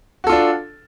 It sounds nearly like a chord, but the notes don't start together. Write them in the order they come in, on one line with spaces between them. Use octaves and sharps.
F#4 A4 F4 D4